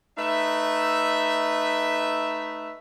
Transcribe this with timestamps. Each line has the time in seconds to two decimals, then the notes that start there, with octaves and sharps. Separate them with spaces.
0.18 A3 D#4 B4 E5